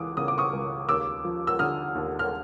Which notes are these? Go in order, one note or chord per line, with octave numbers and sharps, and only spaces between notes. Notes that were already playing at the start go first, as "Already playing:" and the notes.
Already playing: C#2 E3 D6 D#6
C#3 D#6
D6
C#6 D#6
C#2
D#2 D6 E6
F3
E6
D3 D#6 F6
D#2
F6